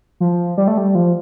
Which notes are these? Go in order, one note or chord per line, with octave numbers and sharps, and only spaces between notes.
F3
G3
A3
G3
F3